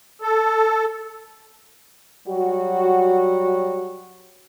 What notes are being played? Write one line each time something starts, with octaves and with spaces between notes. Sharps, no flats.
A4
F#3 G3 F#4